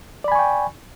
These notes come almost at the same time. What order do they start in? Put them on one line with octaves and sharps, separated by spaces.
D5 B5 G#5 C#6 G5